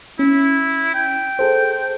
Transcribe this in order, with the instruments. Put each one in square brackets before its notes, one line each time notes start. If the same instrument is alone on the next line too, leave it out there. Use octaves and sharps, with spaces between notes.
[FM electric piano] C#4 [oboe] E4
[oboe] G5
[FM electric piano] G#4 A4 C5